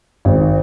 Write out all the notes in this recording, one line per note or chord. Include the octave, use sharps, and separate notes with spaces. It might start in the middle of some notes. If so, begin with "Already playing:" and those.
G#1